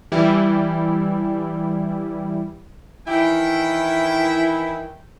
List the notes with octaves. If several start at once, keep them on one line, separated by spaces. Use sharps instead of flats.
E3 G3 E4
D#3 E3 E4 G5